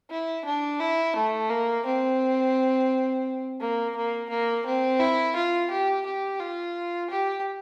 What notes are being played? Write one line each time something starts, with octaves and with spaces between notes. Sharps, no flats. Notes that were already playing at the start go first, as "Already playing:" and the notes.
E4
D4
E4
A3
A#3
C4
A#3
A#3
A#3
C4
E4
F4
G4
G4
F4
G4